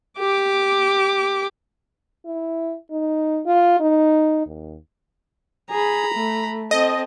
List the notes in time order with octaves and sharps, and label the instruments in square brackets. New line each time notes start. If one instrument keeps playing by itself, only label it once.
[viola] G4 D6
[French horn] E4
D#4
F4
D#4
D#2
[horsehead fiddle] G#4 [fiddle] A#5 B5
[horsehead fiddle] A3
[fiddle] C4 [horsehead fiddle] A4 [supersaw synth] D#5